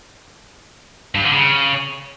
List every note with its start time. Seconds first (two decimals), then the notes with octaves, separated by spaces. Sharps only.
1.15 G2
1.24 D3
1.33 C#3